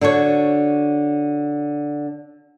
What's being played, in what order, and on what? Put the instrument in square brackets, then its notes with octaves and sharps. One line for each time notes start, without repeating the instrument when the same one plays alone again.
[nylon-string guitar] D3 D4 F#4 C#5